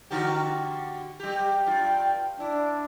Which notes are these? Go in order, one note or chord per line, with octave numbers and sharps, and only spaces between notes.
D3 F#4 G4
G3 G4 G5
G2 F4
D4 E4